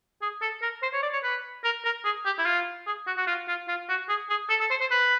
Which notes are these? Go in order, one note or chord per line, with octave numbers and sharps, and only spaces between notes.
G#4
A4
A#4
C5
C#5
D5
C#5
B4
A#4
A#4
G#4
G4
E4
F4
G#4
F#4
F#4
F4
F4
F4
F#4
G#4
G#4
A4
A4
C5
C5
B4